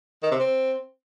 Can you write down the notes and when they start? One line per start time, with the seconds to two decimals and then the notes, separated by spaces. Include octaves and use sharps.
0.23 D#3
0.31 C3
0.40 C4